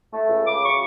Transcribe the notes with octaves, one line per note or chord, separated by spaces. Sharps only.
A3
C#2
C#3 D6
F#3 C#6